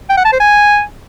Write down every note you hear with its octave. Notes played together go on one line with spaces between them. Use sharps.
G5
F#5
A5
C5
G#5